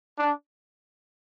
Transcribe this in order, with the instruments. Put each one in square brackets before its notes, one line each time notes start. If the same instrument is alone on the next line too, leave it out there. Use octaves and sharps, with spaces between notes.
[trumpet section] D4